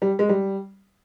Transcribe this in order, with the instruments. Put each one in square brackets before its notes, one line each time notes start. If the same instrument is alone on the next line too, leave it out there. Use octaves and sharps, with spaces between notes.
[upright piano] G3
G#3
G3